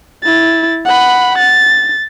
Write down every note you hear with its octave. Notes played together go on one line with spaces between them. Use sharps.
E4 A6
F#5 B5
A6